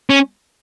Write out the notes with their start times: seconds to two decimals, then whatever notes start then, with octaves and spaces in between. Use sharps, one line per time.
0.10 C#4